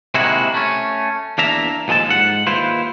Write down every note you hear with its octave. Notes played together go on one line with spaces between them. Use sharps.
C3 D#3 G#3 A#3 E4 F#4
A3 C#4
E2 A#3 D4 E5 A#5
D#2 F3 G#3 A4 A5
G#2 F#5
D#2 E4 F4 B4 C5